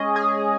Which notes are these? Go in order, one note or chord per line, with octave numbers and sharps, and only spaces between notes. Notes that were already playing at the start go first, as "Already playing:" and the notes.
Already playing: G#3 C#4 G#4 D#5
G#4